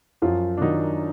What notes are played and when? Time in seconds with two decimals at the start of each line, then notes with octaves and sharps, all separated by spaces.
0.22 F#2 F3 F4
0.57 D4
0.61 D#3 F#3 D#4